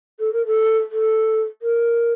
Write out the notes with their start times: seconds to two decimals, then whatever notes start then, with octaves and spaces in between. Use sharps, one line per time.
0.19 A4
0.33 A#4
0.46 A4
0.91 A4
1.62 A#4